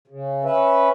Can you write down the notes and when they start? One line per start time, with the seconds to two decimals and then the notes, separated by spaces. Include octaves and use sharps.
0.08 C#3
0.45 C#4 B4 E5